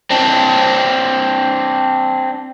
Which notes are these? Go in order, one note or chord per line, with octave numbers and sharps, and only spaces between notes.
C4 D4